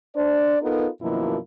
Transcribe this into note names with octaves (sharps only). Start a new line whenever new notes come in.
D4 C5 D5
B3 D#4 F4 A4 A#4
F#2 B2 D#3 F3 A#3 E4